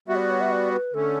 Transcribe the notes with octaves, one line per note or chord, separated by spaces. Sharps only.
G3 B3 F#4 E5
C#5
D5
C#5
E5
D5
B4
D3 A3 C#4 A4